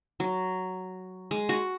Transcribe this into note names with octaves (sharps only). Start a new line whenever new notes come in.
F#3
G#3
F#4